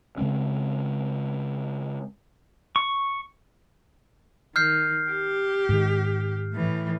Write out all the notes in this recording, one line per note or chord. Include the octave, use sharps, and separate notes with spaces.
C#3 G#3 C4 C#4
C#6
D#3 F6 G6 C7
G4
G#2 D#3
A2 E3